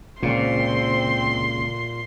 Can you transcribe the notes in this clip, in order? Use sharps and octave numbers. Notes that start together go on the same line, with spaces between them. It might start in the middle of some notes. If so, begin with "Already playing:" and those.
C#2 A#2 C#3 A#3 C4 C6